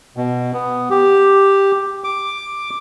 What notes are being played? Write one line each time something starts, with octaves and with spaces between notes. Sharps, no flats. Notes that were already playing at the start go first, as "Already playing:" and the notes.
B2
B3
G4
D6